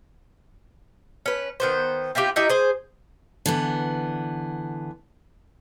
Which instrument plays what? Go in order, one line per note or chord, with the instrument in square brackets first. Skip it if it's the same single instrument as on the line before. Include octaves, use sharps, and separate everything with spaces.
[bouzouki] C#4 B4
D#3 B3 C5
C4 E4 F4 G4
D#4 E4 G4 D#5
G#4 C5
[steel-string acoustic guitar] D3 E3 B3